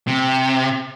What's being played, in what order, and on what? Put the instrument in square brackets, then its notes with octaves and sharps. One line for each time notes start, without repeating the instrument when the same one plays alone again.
[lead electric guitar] C3